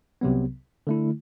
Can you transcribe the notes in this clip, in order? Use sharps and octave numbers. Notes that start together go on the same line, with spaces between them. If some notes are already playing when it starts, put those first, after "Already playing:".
C2 C3 F#3 B3
D3 A3 E4